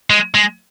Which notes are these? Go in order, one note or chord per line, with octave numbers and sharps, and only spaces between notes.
G#3
G#3